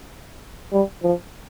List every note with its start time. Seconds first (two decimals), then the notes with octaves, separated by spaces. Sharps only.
0.73 G3
1.03 F3